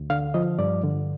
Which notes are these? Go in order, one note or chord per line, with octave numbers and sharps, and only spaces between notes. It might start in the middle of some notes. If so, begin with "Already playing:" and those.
Already playing: D2
D3 F5
F3 D#5
G2 D5
D3